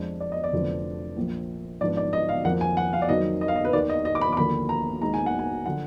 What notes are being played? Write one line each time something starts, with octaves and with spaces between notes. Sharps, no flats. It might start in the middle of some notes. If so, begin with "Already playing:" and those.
Already playing: F2 F3 G#3 D4
D5
D#5
D5
F1 F2 D3 F3 B3
A#1 A#2 F3
G#2 F3 B3 D4 D5
D5
D#5
F5
F2 F3 A#3 F#5
G#5
F#5
F5
D5
F2 D#3 F#3 A#3 D#5
D#5
F5
D#5
B4
D#2 D#3 A#3 D5
D#5
D#5
D6
B5
D6
D#2 D3 F3 A#3 B5
A#5
D#2 D#3 G#3 A#5
G#5
F#5
G#5
D3 F3 F#5